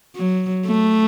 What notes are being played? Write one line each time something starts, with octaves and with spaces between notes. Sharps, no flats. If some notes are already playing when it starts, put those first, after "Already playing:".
F#3
A3